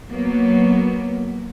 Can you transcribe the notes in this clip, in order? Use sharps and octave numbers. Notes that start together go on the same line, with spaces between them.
F#3 A#3 B3